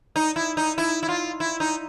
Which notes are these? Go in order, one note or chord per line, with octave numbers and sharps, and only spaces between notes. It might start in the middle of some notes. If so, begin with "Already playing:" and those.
D#4
E4
D#4
E4
E4
F4
E4
D#4